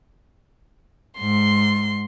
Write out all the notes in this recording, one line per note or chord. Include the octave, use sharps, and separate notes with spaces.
G#2 C6